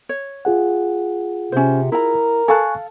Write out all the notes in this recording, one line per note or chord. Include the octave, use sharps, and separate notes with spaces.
C#5
F4 G#4 F#5
C3 C#4 C5
E4 A#4 A#5
A4 F5 G#5 A5 C#6 F#6